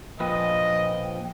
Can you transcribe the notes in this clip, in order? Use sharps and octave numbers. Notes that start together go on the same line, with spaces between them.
A#2 F3 B4 D#5 G5